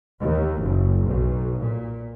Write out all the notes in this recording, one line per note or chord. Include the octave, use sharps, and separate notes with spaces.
D#2
F#1
B1
A#2